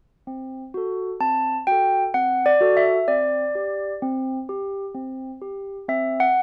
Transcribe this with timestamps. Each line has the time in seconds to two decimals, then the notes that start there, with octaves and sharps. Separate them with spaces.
0.27 C4
0.74 F#4 A4
1.20 C4 A5
1.67 F#4 A4 G5
2.14 C4 F#5
2.46 D5
2.61 F#4 A4
2.77 E5
3.08 C4 D5
3.55 G4
4.02 C4
4.49 G4
4.95 C4
5.42 G4
5.89 C4 E5
6.20 F#5